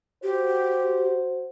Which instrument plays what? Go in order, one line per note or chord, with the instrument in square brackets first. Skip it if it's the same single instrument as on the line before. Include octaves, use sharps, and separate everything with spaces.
[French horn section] F#4 C5 [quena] G4